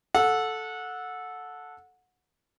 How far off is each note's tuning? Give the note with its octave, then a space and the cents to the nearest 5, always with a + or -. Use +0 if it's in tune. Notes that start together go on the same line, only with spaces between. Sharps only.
A4 -5 F#5 -20